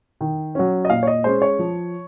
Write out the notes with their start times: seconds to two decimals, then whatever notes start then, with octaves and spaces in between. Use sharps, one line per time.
0.21 D#3
0.55 F#3 C#4
0.85 D#5
0.90 A#2 F5
1.03 C#5
1.07 D#5
1.24 G#3 C#4 C5
1.42 C#5
1.59 F3